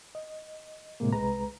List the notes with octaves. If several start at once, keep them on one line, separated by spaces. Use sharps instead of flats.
D#5
A2 C3 G#3 A#3
C2 G#3 B4 A#5